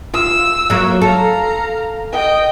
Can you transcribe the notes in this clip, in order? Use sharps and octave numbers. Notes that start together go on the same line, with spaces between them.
F4 E6
F#3 A#3
A4 F5 A#5
D#5 G5